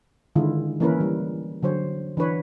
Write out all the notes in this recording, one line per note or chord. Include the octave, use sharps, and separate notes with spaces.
D3 D#3 G#3 E4 F4
E3 A#3 C#4 E4 A#4 B4
G3
D3 F#3 C5 C#5
E3 D4 B4 C#5